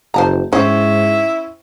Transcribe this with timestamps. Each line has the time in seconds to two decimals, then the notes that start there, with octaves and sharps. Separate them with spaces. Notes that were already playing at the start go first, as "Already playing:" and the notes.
0.14 F#1 C5 A5 A#5
0.53 G#2 C4 C#4 E4 C5